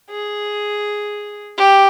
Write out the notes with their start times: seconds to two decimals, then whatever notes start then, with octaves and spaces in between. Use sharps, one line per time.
0.10 G#4
1.57 G4